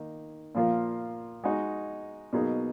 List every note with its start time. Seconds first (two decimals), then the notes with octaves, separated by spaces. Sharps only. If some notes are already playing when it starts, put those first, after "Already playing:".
Already playing: D#3 A#3 D#4
0.55 A#2 F3 A#3 F4
1.44 G#3 D#4 F#4
2.33 B2 F#3 A#3 D#4 G#4